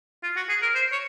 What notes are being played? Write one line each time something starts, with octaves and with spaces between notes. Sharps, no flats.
F4
F#4
G#4
A#4
C5
C#5